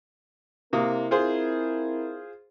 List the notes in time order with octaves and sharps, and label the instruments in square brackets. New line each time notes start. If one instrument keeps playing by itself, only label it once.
[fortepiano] C3 A#3 D#6 [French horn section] C4 E4 A#4
[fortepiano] F4 G#4 C5